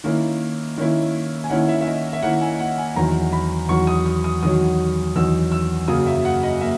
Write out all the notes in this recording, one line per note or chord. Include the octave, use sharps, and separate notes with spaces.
D#3 A#3 C#4 E4
D#3 A#3 C#4 E4
G#5
D#3 A#3 C#4 E4 F#5
E5
E5
D#5
E5
D#3 A#3 C#4 E4 F#5
G#5
F#5
G#5
E2 D#3 F#3 A#5
B5
E2 D#3 F#3 C#6
D#6
D#6
D#6
E2 D#3 F#3 D#6
E2 D#3 F#3 E6
E6
F#2 C#3 F#3 A#3 D#6
E5
F#5
D#5
A#3 E5